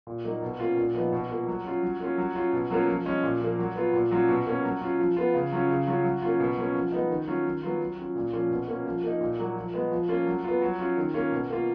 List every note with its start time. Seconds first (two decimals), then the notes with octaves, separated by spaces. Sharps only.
0.07 A#2
0.24 F#3 A#3 D#4
0.42 B2
0.60 A#3 C#4 F4
0.77 A#2
0.95 F3 B3 D#4
1.12 B2
1.30 A#3 F4
1.47 F#3
1.65 C#4 F4
1.83 F#3
2.00 A#3 C#4 F4
2.18 F#3
2.35 C#4 F4
2.53 B2
2.70 F#3 A#3 C#4 F4
2.88 F3
3.06 G#3 C#4
3.23 A#2
3.41 F3 A#3
3.59 F#3
3.76 B3 F4
3.94 A#2
4.11 F#3 C#4 F4
4.28 B2
4.46 A#3 C#4
4.64 F#3
4.82 C#4 F4
4.99 F3
5.17 B3 F4
5.34 C#3
5.52 F#3 C#4 F4
5.70 C#3
5.87 F#3 C#4 F4
6.05 F#3
6.22 A#3 C#4 F4
6.40 B2
6.57 F#3 A#3 C#4 F4
6.75 F3
6.92 G#3 B3 D#4
7.10 D#3
7.27 F#3 C#4 F4
7.45 D#3
7.63 F#3 B3 F4
7.80 F#3
7.98 C#4 F4
8.15 A#2
8.33 F3 A#3 C#4 F4
8.51 B2
8.68 A#3 C#4 F4
8.86 F3
9.04 A#3 D#4
9.21 A#2
9.38 F#3 A#3
9.56 F3
9.74 G#3 B3
9.91 F3
10.08 A#3 C#4 F4
10.27 F#3
10.44 B3 F4
10.62 F#3
10.79 C#4 F4
10.97 D#3
11.14 A#3 C#4 F4
11.32 B2
11.50 A#3 F4